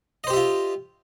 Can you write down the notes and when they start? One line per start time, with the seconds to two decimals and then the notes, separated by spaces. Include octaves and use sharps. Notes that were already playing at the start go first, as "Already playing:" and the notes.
0.24 D#5
0.27 C5
0.30 G4
0.33 E5
0.37 F4